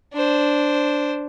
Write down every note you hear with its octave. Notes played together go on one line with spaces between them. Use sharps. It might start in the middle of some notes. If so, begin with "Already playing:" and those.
D4 C5